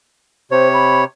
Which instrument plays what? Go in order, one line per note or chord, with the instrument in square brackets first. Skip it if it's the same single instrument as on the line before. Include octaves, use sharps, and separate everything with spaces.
[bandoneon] C3 C#5 [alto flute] C5
[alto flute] B5